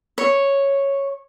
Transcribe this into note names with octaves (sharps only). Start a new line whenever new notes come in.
C#5